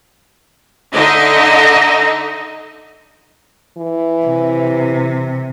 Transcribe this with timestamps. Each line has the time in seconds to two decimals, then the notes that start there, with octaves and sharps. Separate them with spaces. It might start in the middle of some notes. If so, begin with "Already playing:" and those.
0.93 D3 D#4 D#5 E5
3.78 E3
4.27 C3